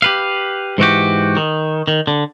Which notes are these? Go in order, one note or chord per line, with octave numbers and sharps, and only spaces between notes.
G4 B4 F5
G#2 E3 F#4 G4
D#3
D#3
D3